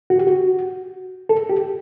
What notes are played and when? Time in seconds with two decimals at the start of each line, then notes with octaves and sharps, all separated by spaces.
0.10 F#4
0.18 G4
0.27 F#4
1.29 A4
1.50 G4